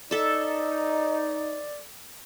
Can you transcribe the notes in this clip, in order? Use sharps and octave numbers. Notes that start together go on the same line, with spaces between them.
D#4 A4 D5 E5